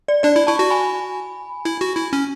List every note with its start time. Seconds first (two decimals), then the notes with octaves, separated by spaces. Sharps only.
0.08 D5
0.23 D4 D5
0.36 E4
0.47 E4 A5 C#6
0.59 F#4
0.70 G#5 B5
1.65 E4
1.81 F#4
1.97 E4
2.13 C#4